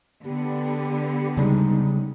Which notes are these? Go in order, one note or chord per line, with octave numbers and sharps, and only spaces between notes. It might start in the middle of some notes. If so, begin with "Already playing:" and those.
D3 B3 G4
C#3 G3 G#3 D#4